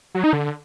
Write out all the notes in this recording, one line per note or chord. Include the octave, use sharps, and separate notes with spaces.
F#3
D#4
D3